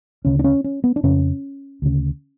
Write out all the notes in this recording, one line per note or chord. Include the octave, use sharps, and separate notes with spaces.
D2 C#3 C#4
D4
C#4
C#4
B3
D4
F2 C#3 C#4
D2 C#3